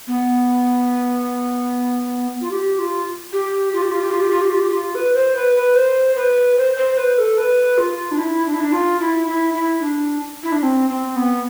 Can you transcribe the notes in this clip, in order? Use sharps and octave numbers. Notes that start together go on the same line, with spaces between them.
B3
F4
G4
F4
G4
F4
G4
F4
G4
F4
G4
F4
G4
F4
G4
F4
B4
C5
B4
B4
C5
B4
C5
C5
B4
A4
B4
F4
D4
E4
D4
E4
D4
F4
E4
E4
E4
D4
E4
D4
C4
C4
B3